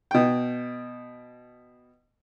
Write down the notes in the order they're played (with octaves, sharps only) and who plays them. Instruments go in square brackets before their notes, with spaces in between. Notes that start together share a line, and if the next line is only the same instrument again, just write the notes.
[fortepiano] B2 G5